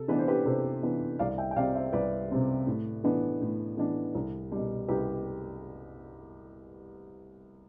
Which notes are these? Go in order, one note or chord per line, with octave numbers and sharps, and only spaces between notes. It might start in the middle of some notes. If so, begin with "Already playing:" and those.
Already playing: C3 A4
E3 B3 D4 B4
C5
G4 B4
C3 A4 C5
E3 B3 D4
C2 D5 F5
E5 G5
G5
C3 G3 C4 D5 F5
C5 E5
C2 B4 D5
C3 G3 C4
A2
E3 B3 D4
A2
E3 B3 D4
C2
B2 G3
C2 G4 B4